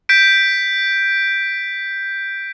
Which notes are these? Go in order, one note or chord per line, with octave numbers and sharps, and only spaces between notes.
G6 B6 D7